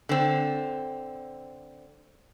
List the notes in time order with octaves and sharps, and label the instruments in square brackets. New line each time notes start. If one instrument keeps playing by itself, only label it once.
[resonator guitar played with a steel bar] D3 C4